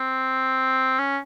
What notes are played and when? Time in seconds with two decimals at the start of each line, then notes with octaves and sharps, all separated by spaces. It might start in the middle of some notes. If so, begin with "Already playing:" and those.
Already playing: C4
0.99 C#4